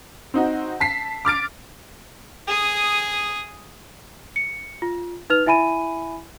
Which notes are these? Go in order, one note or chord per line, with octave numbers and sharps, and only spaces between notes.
C4 D#4 F#4
A5 B6 C7
D6 F6 A6 D7
G#4 D#6
C#7
F4
D#4 B4 F6 F7
E4 E5 G#5 B5 D#7